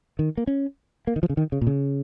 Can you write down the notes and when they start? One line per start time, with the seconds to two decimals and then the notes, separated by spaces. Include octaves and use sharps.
0.19 D#3
0.37 A#3
0.47 C#4
1.07 A#3
1.16 D#3
1.23 F3
1.30 C#3
1.37 D#3
1.52 C#3
1.61 A#2
1.67 C#3